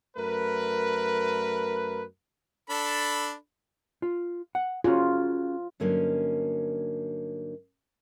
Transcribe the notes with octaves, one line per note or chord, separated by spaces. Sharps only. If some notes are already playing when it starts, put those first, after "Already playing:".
F#2 A3 A#4 B4
D4 A4 B5
F4
F#5
C#4 F4 F#4 G#4
G2 D3 F#3 A#3 C#4 D#4